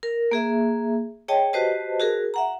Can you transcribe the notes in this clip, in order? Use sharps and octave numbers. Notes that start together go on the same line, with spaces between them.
A#4
A#3 G#4 E5
G#4 C#5 D#5 G5 A5
F#4 G4 B4 C5 D#5 A5
F#4 G#4 A#4
E5 F#5 A#5